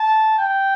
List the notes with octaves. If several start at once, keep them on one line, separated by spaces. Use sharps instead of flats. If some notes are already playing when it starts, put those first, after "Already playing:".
Already playing: A5
G5